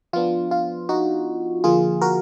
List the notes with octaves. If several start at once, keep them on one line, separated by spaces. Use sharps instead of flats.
F3 B3 D4 F4
F4
D#4 F#4
D3 F3 A#3 F4 G#4
F#4 A#4